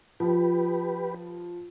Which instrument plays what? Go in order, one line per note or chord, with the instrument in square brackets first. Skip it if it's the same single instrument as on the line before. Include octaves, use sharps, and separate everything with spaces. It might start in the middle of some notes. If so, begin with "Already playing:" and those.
[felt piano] F3 [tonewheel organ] G4 B4